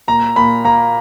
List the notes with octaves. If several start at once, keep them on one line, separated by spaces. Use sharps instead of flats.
A#2 A#5
A#2 B5
A#3 A#5